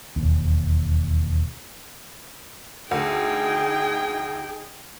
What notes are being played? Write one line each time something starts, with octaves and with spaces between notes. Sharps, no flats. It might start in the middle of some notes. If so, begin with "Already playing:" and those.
E1 D#2
D2 D#4 G#4 G5